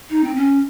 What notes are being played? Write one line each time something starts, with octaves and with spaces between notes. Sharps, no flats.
D#4
C4
C#4